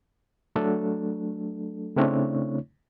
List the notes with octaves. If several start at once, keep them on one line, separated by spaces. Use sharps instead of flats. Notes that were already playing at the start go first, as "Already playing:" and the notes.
F#3 A3 D4 A4
C#3 A3 C4 D4 E4 C#5